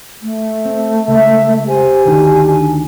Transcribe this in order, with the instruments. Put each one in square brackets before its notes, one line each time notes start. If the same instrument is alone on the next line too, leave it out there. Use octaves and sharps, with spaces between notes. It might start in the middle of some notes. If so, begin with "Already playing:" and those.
[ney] A3
[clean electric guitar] C4
[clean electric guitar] C#2 [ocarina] E5
[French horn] G4 [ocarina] C5 [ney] G#5
[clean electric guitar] D2 D#3 [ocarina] D4